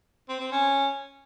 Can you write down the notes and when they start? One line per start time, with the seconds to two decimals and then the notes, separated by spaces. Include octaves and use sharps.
0.29 C4
0.40 C4
0.51 C#4